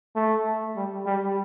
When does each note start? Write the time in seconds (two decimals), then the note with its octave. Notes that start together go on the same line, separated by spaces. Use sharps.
0.16 A3
0.76 G3
1.06 G3